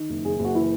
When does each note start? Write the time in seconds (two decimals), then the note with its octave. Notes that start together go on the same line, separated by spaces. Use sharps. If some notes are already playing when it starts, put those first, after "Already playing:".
Already playing: D#3
0.09 F#1
0.25 F#1 G#4
0.39 F#1
0.45 F#4
0.55 E3 E4